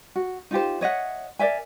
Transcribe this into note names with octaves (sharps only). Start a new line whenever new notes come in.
F#4
D#4 F4 G4 C5
C#5 D#5 E5 F#5
A#4 D5 E5 G#5